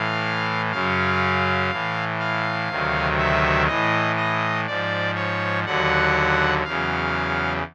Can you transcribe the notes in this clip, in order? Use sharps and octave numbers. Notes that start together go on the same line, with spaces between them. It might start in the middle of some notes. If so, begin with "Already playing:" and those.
Already playing: A2 E3 F5
F#2 C#3 F#3 F5
A2 E3
F5
D2 C3 D#3 F#3
E5
A2 E3 D#5
D#5
G#2 F3 D5
C#5
D#2 D3 F#3 F#5
E2 C#3 F#3 F5